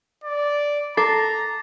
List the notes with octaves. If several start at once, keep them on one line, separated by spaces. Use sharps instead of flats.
D5
A4 A#5 D6 A6 C7